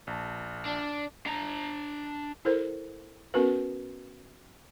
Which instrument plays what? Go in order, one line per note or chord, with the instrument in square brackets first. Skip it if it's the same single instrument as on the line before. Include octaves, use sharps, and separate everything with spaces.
[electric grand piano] A#1 A5
[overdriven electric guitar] D4
D4 A#5
[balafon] E4 A4 A#4 C5
B3 C#4 F#4 A#4 B4